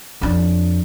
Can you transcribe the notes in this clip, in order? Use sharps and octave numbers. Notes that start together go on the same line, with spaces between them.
F2 D4